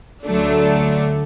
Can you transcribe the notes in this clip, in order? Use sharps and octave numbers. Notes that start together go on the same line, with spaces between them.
D2 D3 F#3 A3 D4